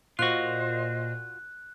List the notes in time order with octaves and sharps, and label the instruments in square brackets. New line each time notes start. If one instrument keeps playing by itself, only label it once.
[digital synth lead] A#2 [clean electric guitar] F4 F#4 [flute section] C5 D#5 [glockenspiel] F#6